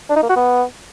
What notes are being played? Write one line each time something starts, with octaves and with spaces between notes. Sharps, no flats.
D4
D#4
A#3
F#4
B3